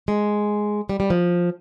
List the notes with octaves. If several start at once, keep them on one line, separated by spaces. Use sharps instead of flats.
G#3
G3
G3
F3